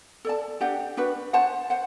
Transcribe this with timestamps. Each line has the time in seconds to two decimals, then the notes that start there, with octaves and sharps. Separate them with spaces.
0.25 A4 D5 A5
0.61 D4 G4 D5 F#5
0.97 D4 F#4 B4
1.33 F#4 C5 F#5 A5
1.70 C5 F#5